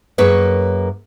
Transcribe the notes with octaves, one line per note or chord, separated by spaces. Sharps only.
F#2 A#3 G#4 B4 C#5